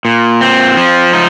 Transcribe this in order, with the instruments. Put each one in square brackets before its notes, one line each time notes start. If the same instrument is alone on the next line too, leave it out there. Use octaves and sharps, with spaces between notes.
[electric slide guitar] A#2
C4
F3
D#4